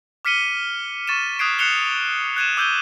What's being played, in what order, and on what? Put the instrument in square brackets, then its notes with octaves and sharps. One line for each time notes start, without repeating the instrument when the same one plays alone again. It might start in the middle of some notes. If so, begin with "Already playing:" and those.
[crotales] D6 F6 B6 C#7 D#7 G7
C#6 A6 D#7 E7
D#6 F#6 G#6 C7 D7
F#6 C7 C#7 E7 F7 G7
F#6 G#6 D#7 E7
D6 E6 G6 G#6 D#7 G7